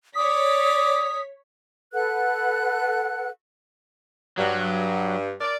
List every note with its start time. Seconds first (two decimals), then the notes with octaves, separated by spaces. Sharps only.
0.15 C#5 D5 D#6 B6
1.94 A4 B4 F#5 F#6
4.37 G2 F#3
5.41 A#4 D5